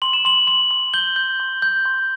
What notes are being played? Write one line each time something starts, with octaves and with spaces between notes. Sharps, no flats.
C6 F#7
E7
C6 F#7
C6 F#7
C6
G6 G7
G6
C6
G6
C6